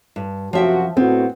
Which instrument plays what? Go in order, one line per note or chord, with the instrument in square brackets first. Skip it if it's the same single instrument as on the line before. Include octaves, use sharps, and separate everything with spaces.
[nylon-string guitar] G2
[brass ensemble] F#2 C3 F#4 [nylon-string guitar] F3 E5 G5
[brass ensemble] A2 F#4 [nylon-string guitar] B3 [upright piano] C4